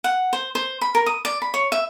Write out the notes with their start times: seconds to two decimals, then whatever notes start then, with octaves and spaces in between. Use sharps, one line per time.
0.04 F#5
0.33 C5
0.55 C5
0.81 B5
0.95 A#4
1.06 D#6
1.25 D5
1.42 B5
1.54 C#5
1.72 E5